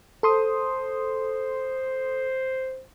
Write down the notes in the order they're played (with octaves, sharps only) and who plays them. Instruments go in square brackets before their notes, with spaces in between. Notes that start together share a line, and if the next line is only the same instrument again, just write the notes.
[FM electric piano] A4 C6 D#6 [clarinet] C5